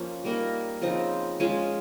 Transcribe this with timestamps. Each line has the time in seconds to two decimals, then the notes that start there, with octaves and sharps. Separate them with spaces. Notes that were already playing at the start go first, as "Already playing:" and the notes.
Already playing: F3 A#3 C#4
0.24 G3 A#3 D#4 A#4
0.81 C#3 F3 C4 D#4
1.40 G#3 C#4 F4 G#4